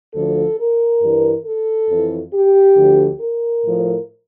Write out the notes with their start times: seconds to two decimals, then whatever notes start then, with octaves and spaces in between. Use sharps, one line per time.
0.14 D2 D3 F3 A4
0.58 A#4
1.02 G2 E3
1.45 A4
1.89 F2 E3
2.33 G4
2.77 D2 D3 F3
3.20 A#4
3.65 A2 F3